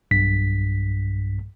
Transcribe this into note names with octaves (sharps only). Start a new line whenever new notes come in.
B1 G2 B6